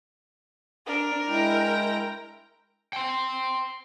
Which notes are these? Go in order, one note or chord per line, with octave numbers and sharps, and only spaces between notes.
D4 A#4
G#3 E4 G5 A#5
G5 C6